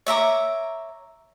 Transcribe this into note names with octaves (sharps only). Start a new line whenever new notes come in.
C#5 E5 A#5 D6